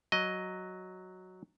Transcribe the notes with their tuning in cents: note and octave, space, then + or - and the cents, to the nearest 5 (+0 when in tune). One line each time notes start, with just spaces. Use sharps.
F#3 +0 D#5 +0